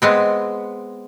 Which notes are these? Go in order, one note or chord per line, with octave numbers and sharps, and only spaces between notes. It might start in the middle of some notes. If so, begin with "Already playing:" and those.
G#3 B3 C4